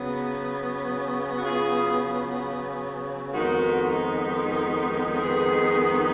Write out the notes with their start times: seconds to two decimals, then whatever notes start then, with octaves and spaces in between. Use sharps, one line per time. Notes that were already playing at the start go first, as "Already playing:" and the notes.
Already playing: C#3 F#3 B3
1.37 F#4
1.43 F4 G#4
3.33 F2 D#3 G#3 B3 D#4 F#4 A#4
5.18 A#4
5.23 G#4 B4